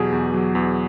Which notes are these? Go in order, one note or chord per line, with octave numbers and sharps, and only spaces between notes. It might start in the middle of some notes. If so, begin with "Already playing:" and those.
Already playing: E2 B2 F#3 G4 G#4
E2
F#3
E2